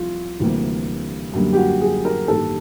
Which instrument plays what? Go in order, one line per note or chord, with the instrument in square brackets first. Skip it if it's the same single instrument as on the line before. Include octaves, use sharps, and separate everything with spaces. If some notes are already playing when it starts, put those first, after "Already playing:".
Already playing: [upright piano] C2 C3 F3 F4
D2 C3 E3 G3 A#3
F#2 D3 G3 A#3
G4
F#4
G#4
A#4
A1 G2 D#3 G3 A#3 A4